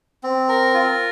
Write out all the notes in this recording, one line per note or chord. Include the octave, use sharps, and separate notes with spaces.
C4
A#4
F4